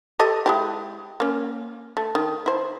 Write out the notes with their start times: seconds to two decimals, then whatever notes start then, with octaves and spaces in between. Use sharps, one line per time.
0.19 G4 A4 D#5
0.46 G#3 E4 G4
1.20 A#3 C#4
1.97 A3
2.15 D#3
2.46 E4 C5